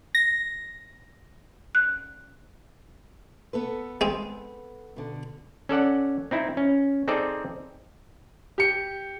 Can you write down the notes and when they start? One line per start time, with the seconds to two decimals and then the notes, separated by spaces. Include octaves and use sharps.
0.15 A#6
1.75 F#6
3.53 B3 A4 B4
4.01 G#3 C4
4.96 B2 D3
5.69 C#4 A4 D5 F#5
6.31 C4 D#4 E4
6.57 C#4
7.08 C4 D#4 G#4 A4 D5
8.58 G4 C#7